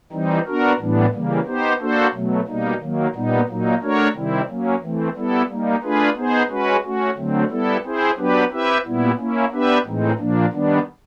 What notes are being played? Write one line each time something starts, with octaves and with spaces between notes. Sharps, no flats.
E3 G3 C4 D#4
B3 D4 F#4 A#4
A2 E3 G3 B3 D4
C#3 E3 G3 A#3
B3 D#4 G4 C5
A#3 D4 F#4 A4 C5
B2 F#3 A3
B2 G3 A#3 D#4
D#3 F#3 A#3
A#2 G3 B3 D#4
A#2 F#3 A#3 D#4
A3 D4 F#4 A#4 C#5
C3 D#3 G3 C4 E4
F#3 A#3 C#4
E3 A3 C4
G3 B3 E4 A4
G3 A#3 D#4
A3 D4 F4 G#4 B4
B3 D#4 G#4 C5
G#3 C#4 F#4 B4
A3 C#4 F#4
D3 F#3 A3 C4
G3 B3 E4 A4
C4 E4 G#4 C5
F#3 B3 D4 G4 B4
C4 E4 G4 B4 E5
A#2 G3 B3 E4
A#3 C#4 E4
B3 D4 G4 B4 E5
A2 E3 G#3 C4 D#4
A#2 F3 A#3 D4
D#3 G3 B3 D4